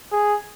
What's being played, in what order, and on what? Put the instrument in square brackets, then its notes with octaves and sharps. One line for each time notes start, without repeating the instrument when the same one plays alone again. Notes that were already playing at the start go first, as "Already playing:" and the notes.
[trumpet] G#4